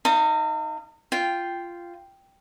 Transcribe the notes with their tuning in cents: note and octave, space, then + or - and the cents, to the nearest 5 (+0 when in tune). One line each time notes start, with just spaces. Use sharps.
D#4 +5 F5 -35 A#5 -40
F4 -10 G5 +0